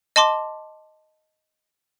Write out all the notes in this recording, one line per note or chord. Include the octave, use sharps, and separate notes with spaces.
D#5 A5 C6 D6